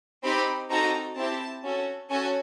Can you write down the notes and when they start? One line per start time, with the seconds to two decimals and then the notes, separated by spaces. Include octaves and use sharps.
0.23 C4 D#4 G4 B5
0.70 C4 D#4 F#4 A4 A#5
1.16 C4 E4 G4 A5
1.63 C#4 F#4 A4
2.10 C#4 F#4 A4 G#5